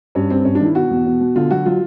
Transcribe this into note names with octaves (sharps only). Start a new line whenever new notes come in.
G2 C#4
G2 C4
G2 C#4
D4
D#3
E4
B2 F#4
E2
B2
B2
D3 F4
F#3 F#4
F#3 F4